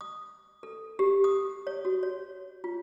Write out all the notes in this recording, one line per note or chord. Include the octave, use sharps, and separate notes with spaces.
D#6
A4
G4
D#6
C#5
F#4
C#5
F4